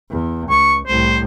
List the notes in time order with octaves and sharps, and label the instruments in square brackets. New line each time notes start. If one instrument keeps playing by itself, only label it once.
[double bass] E2
[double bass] C#2 [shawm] C#6
[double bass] C2 A2 [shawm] C5